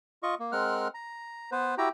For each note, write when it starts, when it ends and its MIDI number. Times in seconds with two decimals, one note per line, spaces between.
0.23 0.35 65
0.23 0.35 75
0.23 0.35 85
0.40 0.52 58
0.52 0.88 56
0.52 0.88 60
0.52 0.88 70
0.52 0.88 78
0.52 0.88 89
0.52 0.88 90
0.94 1.50 82
1.52 1.75 59
1.52 1.75 71
1.52 1.75 72
1.78 1.89 64
1.78 1.89 66
1.78 1.89 67
1.78 1.89 79
1.78 1.89 82